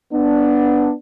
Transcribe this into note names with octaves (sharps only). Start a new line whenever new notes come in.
B3 D4